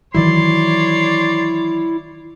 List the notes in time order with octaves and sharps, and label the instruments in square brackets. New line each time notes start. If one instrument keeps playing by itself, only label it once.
[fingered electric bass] D#3 E3 F#3 [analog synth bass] E4 [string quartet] C#5 D5 [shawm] C6